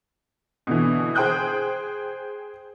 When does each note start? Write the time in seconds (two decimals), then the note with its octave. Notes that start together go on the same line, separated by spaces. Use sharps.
0.67 B2 D3 E3
1.15 G#4 C5 G5 D#6 F#6 G6